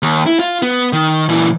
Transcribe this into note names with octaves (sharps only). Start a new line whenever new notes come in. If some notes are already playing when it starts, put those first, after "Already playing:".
D#2
E4
F4
B3
D#3
A#2 E3